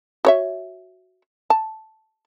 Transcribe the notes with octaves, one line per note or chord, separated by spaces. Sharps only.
F#4 C#5 E5
A5